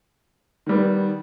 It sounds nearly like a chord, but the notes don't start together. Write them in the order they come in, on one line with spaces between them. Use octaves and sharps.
D#3 G3 B3